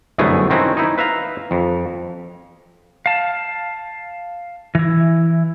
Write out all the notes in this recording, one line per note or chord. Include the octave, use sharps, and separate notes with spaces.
G1 C2 F#2 A3 B3 G#4
D#3 C4 C#4 E4 F#4
D#4 E4
B4 E5 F5 A#5
F2
F5 A5
E3 E4